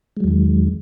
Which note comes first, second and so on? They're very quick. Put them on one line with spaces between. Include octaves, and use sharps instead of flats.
G#3 F#3 E2 D#3